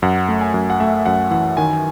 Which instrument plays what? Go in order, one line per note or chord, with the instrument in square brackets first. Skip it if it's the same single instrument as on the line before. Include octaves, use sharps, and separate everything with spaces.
[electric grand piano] F#2 [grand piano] F#5
[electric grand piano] A3
[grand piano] G#5
[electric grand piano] F#2
[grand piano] F#5
[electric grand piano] A3 [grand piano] E5
[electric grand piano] F#2 [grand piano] F#5
[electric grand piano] E3 [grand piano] F#5
[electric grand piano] D#3 [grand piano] G#5